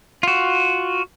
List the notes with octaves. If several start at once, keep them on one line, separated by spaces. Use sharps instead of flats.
F4 F#4